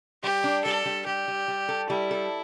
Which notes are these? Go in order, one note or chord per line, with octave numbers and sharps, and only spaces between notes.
G3 G4
D4
G3 A4
G3
G3 G4
G3
G3
A4
G3 E4
A4